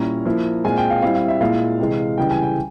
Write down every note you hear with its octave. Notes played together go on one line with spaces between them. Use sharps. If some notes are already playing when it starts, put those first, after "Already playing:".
Already playing: A#2 G3 C#4 E4 A#5
F3 A#3 E4
A#2 G#3 C4 F4 G#5
G5
F5
G3 C4 E4 F5
F5
E5
A#2 G#3 E4 F5
C3 E3 G#3
C#3 E3 G3 G5
G#5
G5